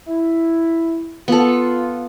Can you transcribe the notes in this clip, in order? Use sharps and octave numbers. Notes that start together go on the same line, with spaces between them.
E4
B3 F4 A4